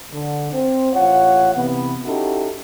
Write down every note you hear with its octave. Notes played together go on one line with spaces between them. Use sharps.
D3
C4 C5
A1 F4 C#5 F#5
C3 E3 B3
C#4 D#4 E4 F#4 G4 A4